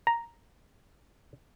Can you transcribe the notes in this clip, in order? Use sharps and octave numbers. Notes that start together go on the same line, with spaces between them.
A#5